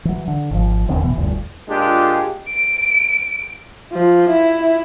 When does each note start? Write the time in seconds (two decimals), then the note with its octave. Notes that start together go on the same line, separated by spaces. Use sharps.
0.05 E3 F#3
0.28 D3
0.51 G#1 F3
0.88 E1 D#2 D3 C4
1.03 B2 E3 B3
1.17 F1 D2 G2
1.69 A#2 G#3 D4 F4 G4
2.48 D7
3.93 F3
4.30 E4